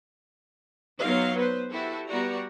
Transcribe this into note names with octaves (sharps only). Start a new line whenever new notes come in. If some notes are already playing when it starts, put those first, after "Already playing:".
F#3 B3 D#4 F4 F5
B3 B4 C5
E4 F#4 G4 A4
G3 B3 F#4 D5 A#5